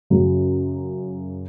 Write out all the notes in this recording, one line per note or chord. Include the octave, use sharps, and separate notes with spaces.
F#2 C#3 F#3